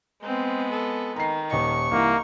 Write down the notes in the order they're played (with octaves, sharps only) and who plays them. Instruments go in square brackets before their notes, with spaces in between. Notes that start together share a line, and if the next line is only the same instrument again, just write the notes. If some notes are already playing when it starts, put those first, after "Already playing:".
[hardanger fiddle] G#3 B3 [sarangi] C4
[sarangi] A4
[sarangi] D#3 [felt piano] A#5 C7
[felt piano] D#1 D#5 [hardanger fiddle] C#6
[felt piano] C2 E3 [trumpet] A#3 [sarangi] D#4